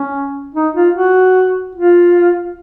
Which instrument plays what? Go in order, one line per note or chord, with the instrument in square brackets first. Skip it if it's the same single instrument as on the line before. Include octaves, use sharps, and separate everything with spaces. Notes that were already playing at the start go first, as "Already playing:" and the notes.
Already playing: [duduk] C#4
D#4
F4
F#4
F4